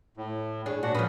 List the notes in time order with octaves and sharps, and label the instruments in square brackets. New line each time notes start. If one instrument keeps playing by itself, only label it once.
[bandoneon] A2
[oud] D4 G#4 C#5
[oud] A#2 [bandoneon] D4 F#4 F#5
[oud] F3 F4 B4 [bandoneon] C#4 D#6